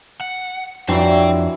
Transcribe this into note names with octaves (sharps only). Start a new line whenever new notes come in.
F#5
F2 E3 F#3 D4 E4 C5 G5